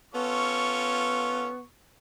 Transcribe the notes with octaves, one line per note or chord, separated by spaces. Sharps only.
B3 C#4 F4 A4 C#6